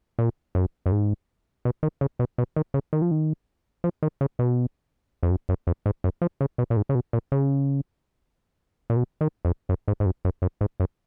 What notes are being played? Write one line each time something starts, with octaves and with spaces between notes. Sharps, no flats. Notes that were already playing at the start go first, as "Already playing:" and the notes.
A#2
F#2
F#2
G#2
B2
D#3
C#3
B2
B2
D#3
C#3
D#3
F3
D#3
F3
D#3
C#3
B2
F2
F#2
F#2
F2
G#2
F#2
F3
C#3
B2
A#2
G#2
C#3
B2
A#2
C#3
A#2
B2
D#3
F2
F#2
G#2
G#2
F#2
F#2
F#2
G#2
F#2